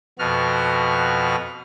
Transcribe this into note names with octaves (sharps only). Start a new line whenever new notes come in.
F2 B2 B3 F#4 F6